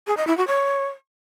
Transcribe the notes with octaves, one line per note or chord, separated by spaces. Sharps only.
G#4
D#5
E4
F#4
C#5